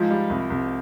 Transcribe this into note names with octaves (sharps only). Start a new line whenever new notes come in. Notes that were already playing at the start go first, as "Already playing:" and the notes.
Already playing: G#2 F3 F4
G3
C2
C2